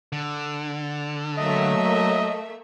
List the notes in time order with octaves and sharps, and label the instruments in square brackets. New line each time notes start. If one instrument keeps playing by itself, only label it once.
[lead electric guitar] D3
[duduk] F#3 [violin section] A3 A#3 E5 [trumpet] D#5